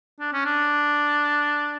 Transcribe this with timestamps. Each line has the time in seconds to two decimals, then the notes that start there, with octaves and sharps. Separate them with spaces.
0.20 D4
0.33 C#4
0.46 D4